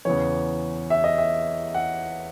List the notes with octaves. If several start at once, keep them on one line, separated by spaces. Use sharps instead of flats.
E2 C#3 E3 C#5
E5
D#5
E5
F#5